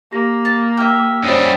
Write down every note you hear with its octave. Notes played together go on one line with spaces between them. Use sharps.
A#3 G4 A#6
A5
G4 E5 F6
F#2 G3 C5 C#5 D#6